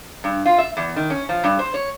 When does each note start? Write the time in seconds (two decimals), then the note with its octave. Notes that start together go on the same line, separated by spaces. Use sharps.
0.24 G2
0.46 F4
0.58 E5
0.77 E2
0.96 D#3
1.10 C#4
1.29 F3
1.44 G2
1.59 C5
1.74 C#5